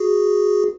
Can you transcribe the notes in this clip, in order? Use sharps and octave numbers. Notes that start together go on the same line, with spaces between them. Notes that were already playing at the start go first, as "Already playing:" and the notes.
Already playing: F#4 G#4